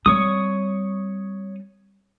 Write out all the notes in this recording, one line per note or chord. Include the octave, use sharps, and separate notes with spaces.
G3 C4 C#5 C#6 D#6